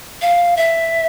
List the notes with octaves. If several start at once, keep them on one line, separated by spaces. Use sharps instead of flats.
F5
E5